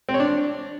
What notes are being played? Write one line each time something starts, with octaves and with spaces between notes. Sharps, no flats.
C4
C#5
D4